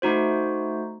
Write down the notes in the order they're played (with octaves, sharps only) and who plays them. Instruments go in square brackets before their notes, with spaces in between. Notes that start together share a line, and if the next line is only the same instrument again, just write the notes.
[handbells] A3 D#4 F#4 C5